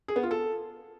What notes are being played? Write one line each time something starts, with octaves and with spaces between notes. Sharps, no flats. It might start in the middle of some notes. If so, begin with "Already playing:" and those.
G#4
B3
F4
A4